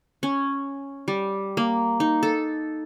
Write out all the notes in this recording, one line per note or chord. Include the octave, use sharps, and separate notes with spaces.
C#4
G3
A#3
D#4
A4